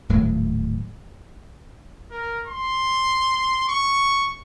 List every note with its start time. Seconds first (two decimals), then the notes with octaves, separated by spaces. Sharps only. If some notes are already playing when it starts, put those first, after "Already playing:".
0.09 D#1 A2 F#3
2.11 A#4
2.47 C6
3.68 C#6